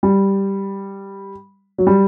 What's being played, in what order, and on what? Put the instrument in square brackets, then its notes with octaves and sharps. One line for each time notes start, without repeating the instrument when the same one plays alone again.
[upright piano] G3
F#3
G3